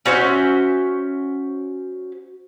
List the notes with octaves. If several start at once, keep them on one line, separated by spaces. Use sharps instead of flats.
C#4 F#4 C5 E5